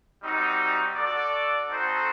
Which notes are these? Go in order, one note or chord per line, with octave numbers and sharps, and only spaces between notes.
G3 C4 D#4 F#4
F#4 A4 D5
C4 D#4 F#4 A4 C5